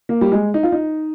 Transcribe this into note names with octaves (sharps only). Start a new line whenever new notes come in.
A#3
G3
G#3
D#4
F4
D#4